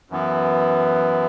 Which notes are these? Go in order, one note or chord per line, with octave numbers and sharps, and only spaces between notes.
F#2 E3 B3